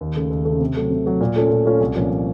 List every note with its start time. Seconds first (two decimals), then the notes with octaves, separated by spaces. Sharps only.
0.01 D#2
0.16 C#3 A3
0.30 D#2
0.45 C#3 A3
0.60 C3
0.76 F#3 A3
0.90 C3
1.06 F#3 A3
1.21 A#2
1.36 A3 C#4 F4 A4
1.50 A#2
1.65 A3 C#4 F4 A4
1.81 C2
1.95 A#2 F3 A#3 C#4